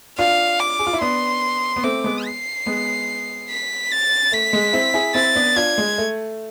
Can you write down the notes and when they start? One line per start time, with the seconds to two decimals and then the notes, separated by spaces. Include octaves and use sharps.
0.18 D4 F4 F5
0.60 D6
0.79 G#4
0.87 F4
0.93 E4
1.01 B3 D4 C6
1.76 B3
1.83 A3 C4 D6
2.04 G#3 B3
2.26 C7
2.66 G#3 B3
3.49 B6
3.91 A6
4.32 A3 B6
4.53 G#3
4.73 C4 E4
4.94 E4 G#4
5.15 C4 E4 A6
5.36 B3 D4
5.56 D4 F4 G#6
5.78 G#3
5.98 A3